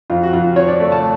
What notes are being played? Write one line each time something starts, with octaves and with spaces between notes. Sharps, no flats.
F2 F4
F#4
F2 F4
F3 C#5
D5
A3
A5